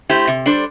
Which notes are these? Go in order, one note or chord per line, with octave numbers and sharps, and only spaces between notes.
A3 E4 G4 C5
C3
G3 D4 A4 C5